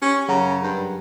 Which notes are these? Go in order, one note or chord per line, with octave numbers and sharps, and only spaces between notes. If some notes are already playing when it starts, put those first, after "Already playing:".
C#4 G4
F#2 C#3 F#5 A#5
G2